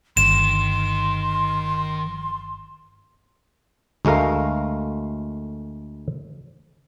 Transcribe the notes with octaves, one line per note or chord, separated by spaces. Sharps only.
G1 D#3 C6 E7
D2 G#3 A3 A#4 F5